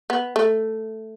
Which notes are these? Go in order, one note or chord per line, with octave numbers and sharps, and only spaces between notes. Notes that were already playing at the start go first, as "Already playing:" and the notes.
B3
A3